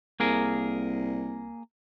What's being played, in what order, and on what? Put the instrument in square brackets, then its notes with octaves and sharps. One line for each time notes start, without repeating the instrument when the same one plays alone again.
[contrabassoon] C2 [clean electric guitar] A#3 G#4 A#4